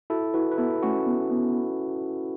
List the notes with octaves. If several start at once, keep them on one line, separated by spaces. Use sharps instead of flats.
E4 F#4 A4
E4 F#4 B4
B4
B3 E4 A4
A3 C#4 F#4
B3
B3